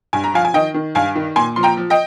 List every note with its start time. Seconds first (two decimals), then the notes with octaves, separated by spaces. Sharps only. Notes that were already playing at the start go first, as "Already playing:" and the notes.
0.13 G2 G#5
0.24 A#5
0.34 F3 F5 G#5
0.45 G#5
0.54 D#3 D#5 G5
0.74 D#3
0.95 G2 F5 G#5
1.15 D#3
1.36 A#2 G#5 C6
1.56 F3 C6
1.63 G5 A#5
1.77 F3
1.90 D#5 G5